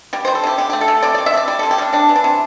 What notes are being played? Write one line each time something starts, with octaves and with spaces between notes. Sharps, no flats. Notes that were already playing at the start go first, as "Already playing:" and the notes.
G3 G4
G3 C5
A4
C3 G4
D3 G4
A3 G4
A4
A3
C3 D5
C3 D5
E5
A3
D5
G3 D5
C3 A4
G4
G3 D4
C3 D4
E3
D4
C3